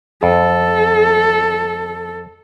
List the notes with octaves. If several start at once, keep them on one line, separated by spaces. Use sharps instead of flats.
F2 A4